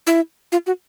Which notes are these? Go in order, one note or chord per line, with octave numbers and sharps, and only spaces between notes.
E4
F4
F#4